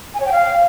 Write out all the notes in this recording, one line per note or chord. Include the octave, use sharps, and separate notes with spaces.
G#5
C#5
G5
F5